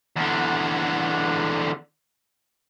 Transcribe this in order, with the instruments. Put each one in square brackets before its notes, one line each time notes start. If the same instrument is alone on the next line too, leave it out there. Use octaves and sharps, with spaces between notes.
[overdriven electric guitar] E2 D3